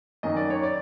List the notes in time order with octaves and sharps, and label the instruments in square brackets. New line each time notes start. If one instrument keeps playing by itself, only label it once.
[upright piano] F#2 D#3 D#5
D5
C#5
D5